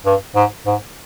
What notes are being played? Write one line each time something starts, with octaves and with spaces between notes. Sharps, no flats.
G2
G#2
G#2